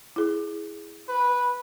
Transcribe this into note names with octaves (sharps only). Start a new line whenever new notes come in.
E4 G#4
B4